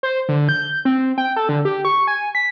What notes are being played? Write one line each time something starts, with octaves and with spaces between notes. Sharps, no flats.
C5
D3
G6
C4
G5
A4
D3
G4
C#6
G#5
B6